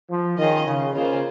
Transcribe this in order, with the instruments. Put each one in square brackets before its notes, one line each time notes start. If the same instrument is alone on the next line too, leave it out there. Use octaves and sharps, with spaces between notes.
[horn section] F3
[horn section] D#3 [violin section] C#4 F4 G#4 D#5
[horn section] C#3
[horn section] C#3 [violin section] A#3 F4 G#4 C5